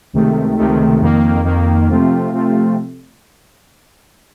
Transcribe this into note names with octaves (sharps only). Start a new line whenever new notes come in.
C#2 C3 D#3 A3
C#2 C3 D#3 A3
F2 D#3 A#3
F2 D#3 A#3
C3 F3 A3 C4 F4
C3 F3 A3 C4 F4